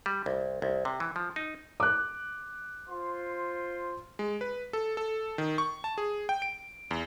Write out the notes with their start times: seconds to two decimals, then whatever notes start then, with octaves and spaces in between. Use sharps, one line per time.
0.06 G3
0.26 C2
0.62 C2
0.85 C3
1.00 E3
1.16 F3
1.36 D#4
1.80 D6 F#6
2.88 F4 C5 C6
4.19 G#3
4.41 B4
4.73 A4
4.97 A4
5.38 D#3
5.58 C#6
5.84 A5
5.98 G#4
6.29 G5
6.42 D7
6.91 E2